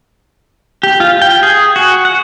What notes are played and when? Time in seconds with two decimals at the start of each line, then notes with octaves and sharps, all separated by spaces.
0.83 G4
1.00 F4
1.22 G5
1.43 G#4
1.76 F#4
2.05 F#5